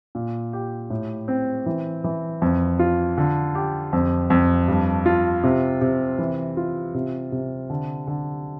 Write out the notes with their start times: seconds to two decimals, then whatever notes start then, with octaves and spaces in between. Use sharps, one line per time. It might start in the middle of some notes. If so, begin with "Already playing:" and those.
0.15 A#2
0.53 G4
0.90 A2
1.28 C4
1.66 E3
2.04 E3
2.42 F2
2.79 F4
3.18 D3
3.55 G4
3.93 F2
4.30 F2
4.68 G2
5.06 F4
5.43 C3
5.81 C3
6.19 E3
6.57 F4
6.94 C3
7.32 C3
7.70 D3
8.07 D3